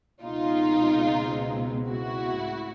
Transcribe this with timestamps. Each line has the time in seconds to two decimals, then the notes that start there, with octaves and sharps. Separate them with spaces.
0.23 C#2 B2 G#3 C4 D#4 F4
1.89 E4 F#4
2.44 A2